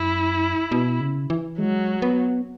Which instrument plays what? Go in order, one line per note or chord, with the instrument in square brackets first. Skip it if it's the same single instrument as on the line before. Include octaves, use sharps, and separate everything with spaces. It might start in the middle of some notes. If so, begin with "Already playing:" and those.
Already playing: [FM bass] F#2 [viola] E4
[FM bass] B2
C#3
E3
[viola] F#3 [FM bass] G#3
[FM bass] B3